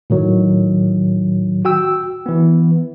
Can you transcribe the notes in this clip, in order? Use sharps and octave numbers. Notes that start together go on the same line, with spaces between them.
A2 D#3 F#3
F#4 G5 E6
E3 B3